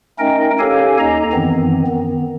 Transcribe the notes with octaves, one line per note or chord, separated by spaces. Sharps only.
A3 C#4 D#4 A#4 D#5 G5
C#4 G4 A4 C#5 F5 G#5
D#2 D#4 D#5 A#5
F#2 D#3 E3 B3 C4
D#3 B3